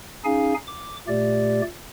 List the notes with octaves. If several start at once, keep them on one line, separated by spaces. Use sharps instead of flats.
C#4 D#4 G#4 F5 G#5
D6
A#2 A3 G4 D5